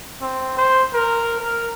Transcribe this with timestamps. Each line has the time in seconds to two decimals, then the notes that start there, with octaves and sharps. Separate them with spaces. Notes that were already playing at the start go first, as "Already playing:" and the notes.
0.21 C4
0.57 C5
0.94 A#4
1.40 A#4